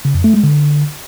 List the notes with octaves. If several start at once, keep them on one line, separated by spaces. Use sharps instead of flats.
C#3
F2
A3
G#3
D3